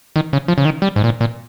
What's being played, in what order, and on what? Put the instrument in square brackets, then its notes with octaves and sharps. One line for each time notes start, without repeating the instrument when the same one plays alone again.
[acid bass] D#3
C#3
F3
C#3
D#3
G3
G#2
A#2
A#2